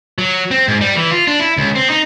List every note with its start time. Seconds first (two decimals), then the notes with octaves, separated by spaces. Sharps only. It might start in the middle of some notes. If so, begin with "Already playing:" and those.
0.18 F#3
0.51 C4
0.68 G#2
0.81 G3
0.95 E3
1.11 F4
1.27 D4
1.39 E4
1.57 C#2
1.75 C4
1.90 D#4